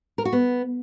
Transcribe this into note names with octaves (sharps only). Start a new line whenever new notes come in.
A#4
F#4
B3